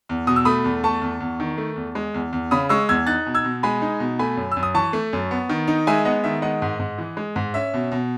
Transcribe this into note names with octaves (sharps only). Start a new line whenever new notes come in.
E2
B2 D#6
E6
A3 B5 D#6
E2
A3 A5 C#6
E2
E2
D#3
A3
E2
G#3
E2
E2
C#3 B5 D#6
G#3 C#6 E6
E2 E6 G#6
D#4 F#6 A6
B2
E6 G#6
B2
G#3 G#5 B5
D#4
B2
A3 G#5 B5
F#2
E6
F#2
D#6
E3 A5 C#6
A3
F#2
B3
D#3
D#4
G#3 E5 G#5
B3 D#5 F#5
D#3 E5
G#3 D#5 F#5
G#2
G#2
E3
G#3
G#2
C#4 E5
B2
B2